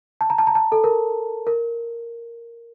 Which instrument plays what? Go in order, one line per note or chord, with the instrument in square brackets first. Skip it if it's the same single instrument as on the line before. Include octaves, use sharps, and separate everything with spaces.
[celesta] A5
A#5
A5
A#5
A5
A4
A#4
A#4